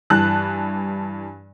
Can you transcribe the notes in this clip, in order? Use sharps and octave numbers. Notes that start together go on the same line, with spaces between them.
G2 E3 A5 F#6